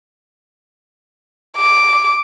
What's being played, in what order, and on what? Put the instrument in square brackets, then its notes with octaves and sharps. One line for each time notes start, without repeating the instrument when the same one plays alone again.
[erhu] D6